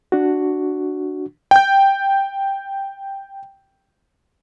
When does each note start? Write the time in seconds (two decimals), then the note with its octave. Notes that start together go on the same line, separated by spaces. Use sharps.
0.12 D4 F#4
1.51 G5 G6